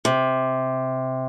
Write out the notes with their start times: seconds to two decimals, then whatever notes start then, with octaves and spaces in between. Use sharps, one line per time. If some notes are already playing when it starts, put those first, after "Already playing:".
0.05 C3